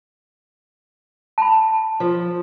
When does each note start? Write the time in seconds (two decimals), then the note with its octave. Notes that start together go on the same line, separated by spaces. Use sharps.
1.38 A5 B5
2.00 F3